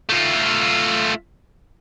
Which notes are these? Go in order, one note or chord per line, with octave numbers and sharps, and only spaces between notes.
A3 F4